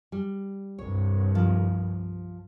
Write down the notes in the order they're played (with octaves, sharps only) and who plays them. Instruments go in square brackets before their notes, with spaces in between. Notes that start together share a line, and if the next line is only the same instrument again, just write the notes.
[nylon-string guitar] G3
[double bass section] C2 G2 [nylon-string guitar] C#5
[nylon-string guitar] F3